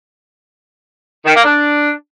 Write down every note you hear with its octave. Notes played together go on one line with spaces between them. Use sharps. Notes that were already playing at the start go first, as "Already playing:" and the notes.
D#3
A#3
D4